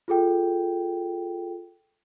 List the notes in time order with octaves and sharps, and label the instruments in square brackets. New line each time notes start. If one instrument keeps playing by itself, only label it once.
[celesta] F4 G#4 A4 G5